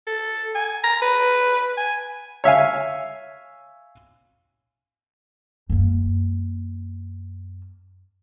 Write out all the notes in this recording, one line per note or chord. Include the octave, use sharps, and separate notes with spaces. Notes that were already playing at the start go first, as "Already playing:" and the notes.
A4
G#5
A#5
B4
G#5
C#5 E5 F5 G#5
F#2 A#3